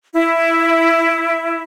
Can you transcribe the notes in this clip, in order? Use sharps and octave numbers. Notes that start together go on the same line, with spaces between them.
E4